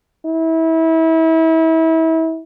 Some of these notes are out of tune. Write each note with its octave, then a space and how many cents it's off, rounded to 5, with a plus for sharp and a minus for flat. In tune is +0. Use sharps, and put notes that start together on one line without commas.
E4 -30